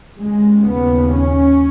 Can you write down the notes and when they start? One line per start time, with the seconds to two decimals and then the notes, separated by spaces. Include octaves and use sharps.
0.21 D#2 C#3 G#3
0.70 B3
1.17 C#4